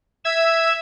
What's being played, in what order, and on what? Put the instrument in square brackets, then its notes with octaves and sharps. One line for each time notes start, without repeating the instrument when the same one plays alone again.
[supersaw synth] E5 [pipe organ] E6 G#6